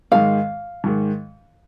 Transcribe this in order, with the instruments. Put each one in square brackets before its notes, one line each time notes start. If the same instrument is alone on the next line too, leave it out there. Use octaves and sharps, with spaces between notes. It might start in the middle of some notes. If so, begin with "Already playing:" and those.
[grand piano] G#2 D#3 G#3 [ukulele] F5
[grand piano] G#2 D#3 G#3